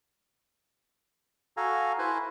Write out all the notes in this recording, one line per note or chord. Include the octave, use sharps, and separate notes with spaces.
F#4 A4 F5 G#5 A#5
E4 B4 C5 G#5